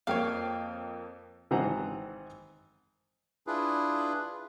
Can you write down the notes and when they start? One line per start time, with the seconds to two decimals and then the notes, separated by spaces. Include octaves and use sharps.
0.07 F2 A#3 C#5 F5 G5
1.51 G#1 E3 C4 C5 F#5 A#5
3.47 D4 E4 F4 G#4 B4